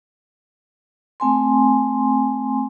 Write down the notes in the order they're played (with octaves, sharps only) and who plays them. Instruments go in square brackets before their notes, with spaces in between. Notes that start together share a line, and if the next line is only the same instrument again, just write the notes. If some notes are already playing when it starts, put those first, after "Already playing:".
[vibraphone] A3 C4 G#5 C6